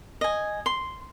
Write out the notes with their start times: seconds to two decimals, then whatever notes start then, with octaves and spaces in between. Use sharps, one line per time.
0.21 D#5 G#5
0.66 C6